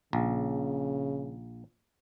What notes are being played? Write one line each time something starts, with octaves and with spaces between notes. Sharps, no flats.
A#1 C#3